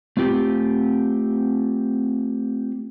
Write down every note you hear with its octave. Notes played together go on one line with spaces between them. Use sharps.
A3 C4 F4 G4